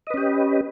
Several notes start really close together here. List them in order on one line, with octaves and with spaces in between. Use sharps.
D#5 B4 C#4 G4